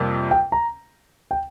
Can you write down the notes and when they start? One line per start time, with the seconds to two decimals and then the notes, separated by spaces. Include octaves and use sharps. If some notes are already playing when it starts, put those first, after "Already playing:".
Already playing: F2 C3 G3 A#3
0.31 G5
0.52 A#5
1.31 G5